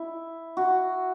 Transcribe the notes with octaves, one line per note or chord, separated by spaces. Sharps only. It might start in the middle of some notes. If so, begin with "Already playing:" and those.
Already playing: E4
F#4